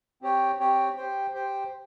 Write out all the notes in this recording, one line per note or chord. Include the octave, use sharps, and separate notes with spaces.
C4 G4 C#5 G5
C4 G4 C#5 G5
G4 C5 G5
G4 C5 G5